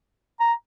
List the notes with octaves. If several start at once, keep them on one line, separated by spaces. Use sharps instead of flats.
A#5